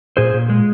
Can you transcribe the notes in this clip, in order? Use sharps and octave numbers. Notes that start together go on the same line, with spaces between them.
A#2 G#4 C5
A#2
G#3